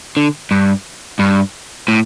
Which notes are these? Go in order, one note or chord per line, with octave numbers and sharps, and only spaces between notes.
D3
G2
G2
A2